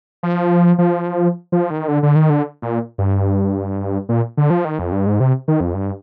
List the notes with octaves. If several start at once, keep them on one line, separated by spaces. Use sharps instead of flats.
F3
F3
F3
D#3
D3
D3
D#3
D3
A#2
G2
A#2
D3
F3
D#3
F2
G2
G#2
C3
D#3
F2
G2